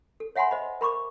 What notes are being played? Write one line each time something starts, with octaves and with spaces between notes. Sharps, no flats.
A4
C#5 E5 F#5 G#5 B5 C6
C5 D#5 B5
A#4 B5 C#6 D6